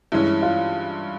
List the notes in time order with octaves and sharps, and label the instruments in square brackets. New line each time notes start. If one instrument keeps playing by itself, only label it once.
[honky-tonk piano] G2 E3 G#3 C#4 [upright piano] E4
[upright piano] F4